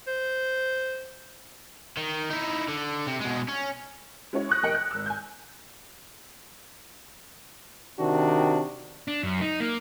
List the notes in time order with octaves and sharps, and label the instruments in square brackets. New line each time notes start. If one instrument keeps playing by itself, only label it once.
[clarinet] C5
[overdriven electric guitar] D#3
D#4 E4
D3
C3
B2 G#3
C#4
[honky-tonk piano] G#3 C#4 E4 F#4 C#5
C#6 D#6 F#6 A#6
F1 A#3 D#5 G5 C#7 F#7
F#6
G#1 E6
G#5 G6
[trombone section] C3 D#3 D4 F#4
[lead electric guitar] D4
F#2
D#4
A#3